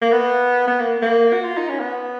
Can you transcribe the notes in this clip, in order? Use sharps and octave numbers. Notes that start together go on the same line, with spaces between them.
A#3
B3
B3
A#3
A#3
F#4
F4
D#4
C#4
B3